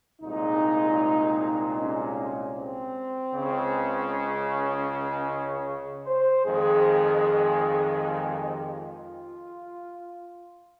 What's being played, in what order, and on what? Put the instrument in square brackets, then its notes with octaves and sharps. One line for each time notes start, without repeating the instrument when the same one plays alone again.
[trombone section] C2 A#2 G#3 D#4
C#4
C4
C#2 C#3 G#3
C#4
C5
F2 D#3 G#3 G#4
G4
F4